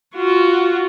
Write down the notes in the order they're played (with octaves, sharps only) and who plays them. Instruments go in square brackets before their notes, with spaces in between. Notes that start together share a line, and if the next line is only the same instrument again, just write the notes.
[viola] F4 F#4